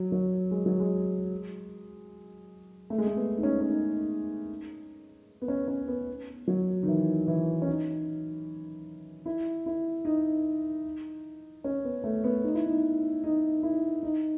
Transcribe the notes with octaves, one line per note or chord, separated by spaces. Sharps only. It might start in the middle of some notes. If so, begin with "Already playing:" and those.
Already playing: F#3
F#3
G#3
F#3
G#3
A3
G#3
A3
B3
D#4
C#4
C#4
D#4
B3
C#4
C#4
B3
F#3
D#3
E3
E3
C#4
D#4
E4
E4
D#4
C#4
B3
A3
B3
D#4
E4
D#4
D#4
E4
D#4